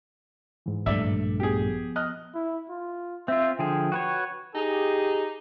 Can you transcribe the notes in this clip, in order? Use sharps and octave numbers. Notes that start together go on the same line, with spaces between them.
G#2 E3
A#1 G2 A3 D5 E5
F3 B3 G4 G#4
D#5 F6 F#6
E4
F4
C4 F4 E5
D3 F3 G#4 G5
F#4 B4 C#5
D#4 G4 G#4